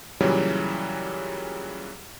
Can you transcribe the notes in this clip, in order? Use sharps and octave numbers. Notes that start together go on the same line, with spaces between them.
A#2 C#3 E3 F#3 G3